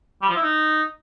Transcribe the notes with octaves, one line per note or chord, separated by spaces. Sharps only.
G3
F3
E4
D#4